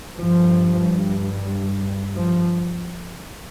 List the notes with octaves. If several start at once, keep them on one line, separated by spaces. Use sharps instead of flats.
G2 F3
F3